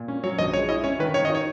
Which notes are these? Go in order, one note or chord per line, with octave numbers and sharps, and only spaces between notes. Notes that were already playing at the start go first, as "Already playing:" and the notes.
Already playing: A#2
C#4
F#3 C#5
A#1 D#5
G#3 C#5
E4 D#5
C#4 C#5
D#3 B4
D#3 C#5
D#5
D#4 C#5